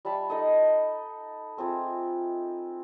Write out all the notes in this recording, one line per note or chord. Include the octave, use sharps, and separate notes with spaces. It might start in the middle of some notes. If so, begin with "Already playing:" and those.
G3 E5 A5 B5
D#4 A4 D#5
A3 C4 F4 G#4